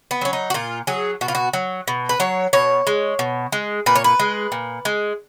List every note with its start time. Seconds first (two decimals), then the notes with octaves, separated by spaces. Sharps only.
0.11 B3
0.21 F#3 C#4
0.33 D#4
0.50 F#4
0.54 A#2 F4
0.87 F#3 G#4
1.21 B2 F#4
1.28 F4
1.35 F#4
1.53 F#3
1.88 B2
2.09 B4
2.20 F#3 C#5
2.53 B2 C#5
2.87 G#3
3.19 B2
3.52 G#3
3.86 A#2 B4
3.95 C#5
4.04 B4
4.20 G#3
4.52 A#2
4.85 G#3